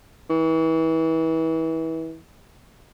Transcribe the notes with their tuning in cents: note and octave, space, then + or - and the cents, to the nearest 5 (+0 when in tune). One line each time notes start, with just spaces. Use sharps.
E3 -30